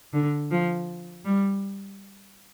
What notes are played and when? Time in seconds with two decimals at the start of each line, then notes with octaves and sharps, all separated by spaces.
0.13 D3
0.51 F3
1.25 G3